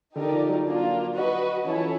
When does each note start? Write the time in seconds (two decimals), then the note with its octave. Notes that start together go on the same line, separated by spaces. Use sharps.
0.15 D3 D#4 G4 A#4 D5
0.32 F3
0.49 F#3
0.66 A#3 D4 F4
1.15 F#4 B4 D#5
1.65 E3 C#4 E4 A4 C#5
1.73 F3
1.81 E3